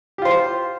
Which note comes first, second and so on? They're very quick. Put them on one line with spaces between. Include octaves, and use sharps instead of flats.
G4 F4 C5